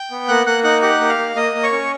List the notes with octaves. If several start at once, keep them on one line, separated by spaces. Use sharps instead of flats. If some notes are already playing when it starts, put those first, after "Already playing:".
Already playing: G5 G6
B3
A#3 F#5 F#6
A#3 F#5 F#6
D#4 F#5 F#6
G4 F#5 F#6
A#3
F5 F6
A#3
A#3 D#5 D#6
A#3
C#5 C#6
C#4